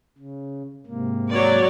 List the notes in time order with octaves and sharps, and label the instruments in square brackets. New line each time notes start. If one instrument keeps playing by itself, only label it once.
[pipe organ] C#3
G#2 C3 A#3
[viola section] F#3 C#5 D5